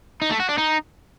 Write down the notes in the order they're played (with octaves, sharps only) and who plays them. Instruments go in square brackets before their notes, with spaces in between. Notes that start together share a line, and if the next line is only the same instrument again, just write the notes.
[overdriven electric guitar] D#4
A3
F#4
D4
D#4